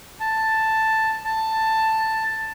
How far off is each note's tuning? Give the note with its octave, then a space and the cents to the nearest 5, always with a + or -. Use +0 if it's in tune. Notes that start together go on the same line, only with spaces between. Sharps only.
A5 +5
A5 +10